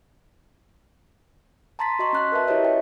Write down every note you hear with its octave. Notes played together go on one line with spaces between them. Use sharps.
A5 A#5 C6 A6 B6
F#4 D#5 C6 C#6
C#4 F#6 B6
A#4 B4 E5 A5
E4 G4 B4 C#5 D#5 E5
G5